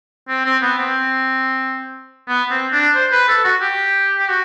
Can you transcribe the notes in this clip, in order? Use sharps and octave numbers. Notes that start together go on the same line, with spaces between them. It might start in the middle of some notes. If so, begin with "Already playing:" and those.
C4
C4
B3
C4
B3
C4
D4
C5
B4
A4
F#4
G4
G4
F#4